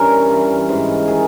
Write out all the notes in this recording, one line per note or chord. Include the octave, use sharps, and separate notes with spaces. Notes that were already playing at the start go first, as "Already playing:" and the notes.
Already playing: G2 E3 C#4 A#4
G2 E3
G#2 E3
D#3 G#4